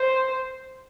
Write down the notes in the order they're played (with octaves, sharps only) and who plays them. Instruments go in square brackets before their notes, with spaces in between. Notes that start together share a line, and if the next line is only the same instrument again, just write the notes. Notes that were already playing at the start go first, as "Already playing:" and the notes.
Already playing: [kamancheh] C5